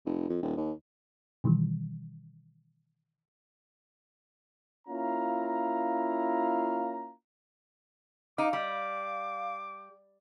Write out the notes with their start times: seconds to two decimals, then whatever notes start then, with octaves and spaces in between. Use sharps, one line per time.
0.06 F1
0.29 F2
0.42 D#1
0.57 D#2
1.44 B2 D#3 E3 G3
4.88 A#3 C#4 E4 F4 F5 A#5
8.38 D#4 F5 D6
8.53 G3 D6